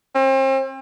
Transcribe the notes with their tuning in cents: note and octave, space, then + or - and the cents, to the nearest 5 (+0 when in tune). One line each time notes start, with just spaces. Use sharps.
C4 +40